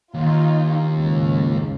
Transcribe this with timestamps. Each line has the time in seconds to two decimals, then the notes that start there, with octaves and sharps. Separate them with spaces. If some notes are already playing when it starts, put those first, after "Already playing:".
0.14 D#2 D#4 F4
0.94 C#2 G#2